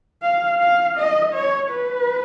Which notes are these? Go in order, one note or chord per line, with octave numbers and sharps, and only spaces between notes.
F5
F5
D#5
C#5
B4